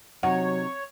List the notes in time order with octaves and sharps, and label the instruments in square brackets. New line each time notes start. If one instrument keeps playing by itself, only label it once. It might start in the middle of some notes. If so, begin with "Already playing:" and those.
[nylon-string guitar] C3 D#4 [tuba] F#3 [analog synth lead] C#5 [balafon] F#5